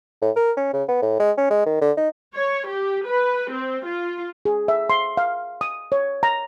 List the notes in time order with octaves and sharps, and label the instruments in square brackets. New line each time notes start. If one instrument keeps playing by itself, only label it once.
[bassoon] A2
A#4
C#4
C#3
B3
A2
G#3
C#4
G#3
D#3
D3
D#4
[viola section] C#5
G4
B4
C4
F4
[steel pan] G#4
E5
C6
F5
D#6
C#5
A#5